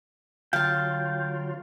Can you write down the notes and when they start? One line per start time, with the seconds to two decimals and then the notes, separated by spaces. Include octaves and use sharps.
0.53 D3 F#3 F4 F5 G5 A5